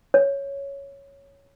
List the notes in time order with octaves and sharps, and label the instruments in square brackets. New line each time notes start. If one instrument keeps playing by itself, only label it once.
[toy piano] C#5